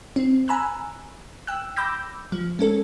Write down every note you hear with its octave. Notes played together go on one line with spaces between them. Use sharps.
C4
G#5 A#5 B5 E6 F#6
G5 E6 F#6
B5 D6 E6 G6 A#6
F3
G#3 C#4 A4